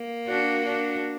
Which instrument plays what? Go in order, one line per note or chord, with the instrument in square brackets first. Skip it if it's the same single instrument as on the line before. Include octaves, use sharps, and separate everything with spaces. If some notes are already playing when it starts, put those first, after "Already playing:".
Already playing: [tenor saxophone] A#3
[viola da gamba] D4 F#4
D4 F#4